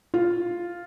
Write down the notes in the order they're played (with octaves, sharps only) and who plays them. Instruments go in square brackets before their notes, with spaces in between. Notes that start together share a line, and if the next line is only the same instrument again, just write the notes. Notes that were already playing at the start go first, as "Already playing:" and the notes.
[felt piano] F4